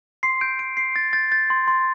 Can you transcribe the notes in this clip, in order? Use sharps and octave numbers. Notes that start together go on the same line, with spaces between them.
C6 C7
G6 D7
G6 D7
C6 C7
C6 A6
G6 A6
G6 A6
C6
C6